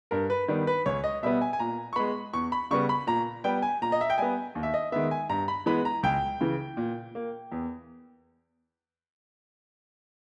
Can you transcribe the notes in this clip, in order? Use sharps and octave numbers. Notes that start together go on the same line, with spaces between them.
G2 A#4
B4
D#3 G3 B3
B4
C#2 C#5
D#5
B2 G3 B3 E5
G#5
G#5
A#2 A#5
C#6
G#3 B3 B5
E2 C#6
B5
C#3 G3 B3 C#6
B5
A#2 A#5
G3 B3 G5
G#5
A#2 A#5
D#5
E5
G5
G3 B3 G#5
D#2
E5
D#5
D#3 G#3 B3 E5
G#5
G2 A#5
B5
E3 G#3 B3 B5
A#5
C#2 G5
C#3 E3
A#2
A#3
E2